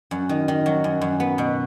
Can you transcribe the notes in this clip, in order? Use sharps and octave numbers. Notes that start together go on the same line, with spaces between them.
F#2
D#3
D#3
F#3
F#2
F#2
B3
B2